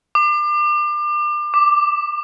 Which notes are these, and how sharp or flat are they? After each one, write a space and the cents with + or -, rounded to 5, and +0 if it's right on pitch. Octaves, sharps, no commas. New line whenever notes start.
D6 +35
D6 +5